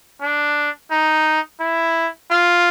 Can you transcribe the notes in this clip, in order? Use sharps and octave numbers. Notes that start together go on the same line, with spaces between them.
D4
D#4
E4
F4